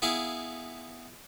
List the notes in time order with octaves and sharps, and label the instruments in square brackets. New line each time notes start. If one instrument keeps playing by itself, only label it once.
[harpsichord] B3 E4 G#4 F5